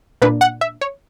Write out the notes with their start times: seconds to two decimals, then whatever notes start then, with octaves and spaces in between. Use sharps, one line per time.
0.22 A#2 A#3 D4 B4
0.41 F#5
0.61 E5
0.81 C#5